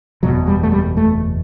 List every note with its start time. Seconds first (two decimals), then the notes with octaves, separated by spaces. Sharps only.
0.23 F#1 E2 B2 F#3
0.47 G3
0.63 A3
0.72 G3
0.97 A3